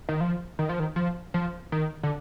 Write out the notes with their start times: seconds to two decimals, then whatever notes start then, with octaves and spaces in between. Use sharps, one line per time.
0.09 D#3
0.21 F3
0.59 D#3
0.69 F3
0.80 D#3
0.96 F3
1.34 F3
1.72 D#3
2.03 D3